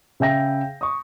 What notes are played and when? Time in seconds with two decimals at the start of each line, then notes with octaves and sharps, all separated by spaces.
0.20 C#3 E5 G5 A#6
0.81 C#6 D#6